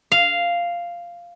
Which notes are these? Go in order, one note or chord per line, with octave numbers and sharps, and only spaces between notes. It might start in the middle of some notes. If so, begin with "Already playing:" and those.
F5